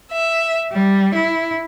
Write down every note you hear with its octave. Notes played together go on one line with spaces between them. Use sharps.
E5
G3
E4